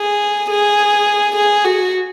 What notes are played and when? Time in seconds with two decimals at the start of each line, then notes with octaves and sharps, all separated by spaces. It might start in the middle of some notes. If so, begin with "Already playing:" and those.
Already playing: G#4
0.50 G#4
1.36 G#4
1.64 F#4